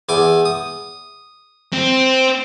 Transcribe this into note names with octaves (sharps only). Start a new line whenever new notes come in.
E2 G#5 D6
D#6
C4